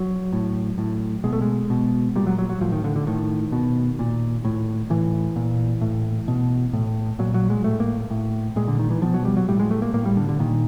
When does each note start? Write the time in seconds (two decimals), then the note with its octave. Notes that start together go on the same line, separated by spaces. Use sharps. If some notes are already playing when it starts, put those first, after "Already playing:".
Already playing: F#3
0.33 A2
0.78 A2
1.24 B2 G#3
1.33 A3
1.42 G#3
1.70 B2
2.16 A#2 G3
2.27 F#3
2.38 F#3
2.50 F#3
2.61 A2 F3
2.72 D#3
2.84 D3
2.96 D3
3.07 A2 D#3
3.52 B2
3.99 A#2
4.45 A2
4.90 A2 E3
5.36 A#2
5.81 A2
6.28 B2
6.73 A2
7.19 A#2 F#3
7.34 F#3
7.50 G#3
7.64 A2 A3
7.80 A#3
8.11 A2
8.56 A#2 G#3
8.68 D3
8.79 D#3
8.90 E3
9.02 B2 F3
9.14 F#3
9.25 G3
9.37 F#3
9.48 A2 G3
9.60 G#3
9.71 A3
9.82 A#3
9.94 A2 A#3
10.05 G3
10.17 D3
10.29 D3
10.39 A#2 D#3